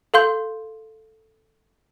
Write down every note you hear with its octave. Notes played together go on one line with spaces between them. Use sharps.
A4 F5 C6 G6